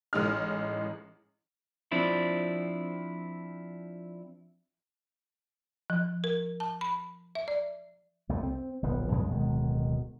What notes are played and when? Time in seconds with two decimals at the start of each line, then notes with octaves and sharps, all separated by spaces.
0.13 A1 G#3 D#4 E4 F6
1.92 F3 C4 D4 E4
5.90 F3
6.24 A#4
6.60 A5
6.81 B5
7.35 E5
7.48 D5
8.29 C2 F2 A3
8.43 C4
8.83 D1 A#1 F3 B3
9.12 F#2 C#3 F3 G#3
9.30 D1 B2 D#3 G#3